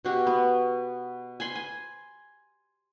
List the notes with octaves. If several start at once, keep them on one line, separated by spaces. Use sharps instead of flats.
B2 F#4 G4
B3
G#5 B5 C6
G#5